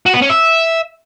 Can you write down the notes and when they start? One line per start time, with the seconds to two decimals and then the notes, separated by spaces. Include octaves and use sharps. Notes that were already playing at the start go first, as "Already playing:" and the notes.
0.06 F#4
0.14 B3
0.22 C#4
0.29 E5